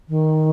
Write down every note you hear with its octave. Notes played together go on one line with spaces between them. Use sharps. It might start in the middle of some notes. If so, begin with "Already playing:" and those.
D#3